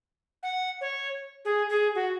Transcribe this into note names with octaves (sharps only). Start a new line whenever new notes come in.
F#5
C#5
G#4
G#4
F#4